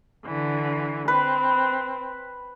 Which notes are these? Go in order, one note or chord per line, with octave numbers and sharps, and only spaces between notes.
D3 E3
C4 B4